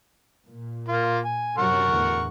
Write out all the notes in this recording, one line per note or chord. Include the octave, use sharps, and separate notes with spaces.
A#2
A#3 F4
G#5
F#2 C3 F#3 A#4 F#5 C#6
E2 A2 D3